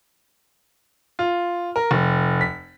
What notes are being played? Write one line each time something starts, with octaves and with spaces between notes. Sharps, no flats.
F4
A#4
F1
B6